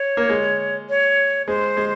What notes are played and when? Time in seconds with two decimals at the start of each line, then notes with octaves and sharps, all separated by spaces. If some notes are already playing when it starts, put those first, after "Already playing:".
Already playing: C#5
0.17 A#3
0.29 G#3
0.89 C#5
1.48 G#3 C5
1.77 G#3